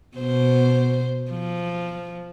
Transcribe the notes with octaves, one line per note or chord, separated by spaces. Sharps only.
B2 C5
F3